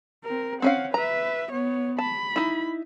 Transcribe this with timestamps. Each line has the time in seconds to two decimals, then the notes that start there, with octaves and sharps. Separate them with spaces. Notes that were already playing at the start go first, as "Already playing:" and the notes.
0.25 C4 A#4
0.62 C4 C#4 F5 F#5
0.94 B4 E5 A#5
1.51 B3 C#5
1.98 A5 B5
2.36 D#4 E4